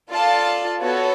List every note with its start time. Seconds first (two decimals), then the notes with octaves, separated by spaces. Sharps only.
0.11 F4 A4 D5 F5 A5
0.81 B3 F#4 A4 C#5